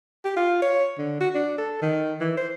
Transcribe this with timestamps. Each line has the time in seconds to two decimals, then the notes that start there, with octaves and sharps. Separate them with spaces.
0.25 G4
0.37 F4
0.62 C#5
0.98 D3
1.21 F#4
1.35 D4
1.58 A4
1.82 D#3
2.21 E3
2.37 C5